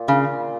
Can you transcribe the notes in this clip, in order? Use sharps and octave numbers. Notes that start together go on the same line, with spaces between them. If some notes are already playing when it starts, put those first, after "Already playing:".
Already playing: A#2
C#3